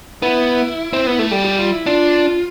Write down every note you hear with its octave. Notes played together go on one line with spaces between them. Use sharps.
B3 E4
C4
B3
A3
G3 G4
G4
F4
E4
D4 F4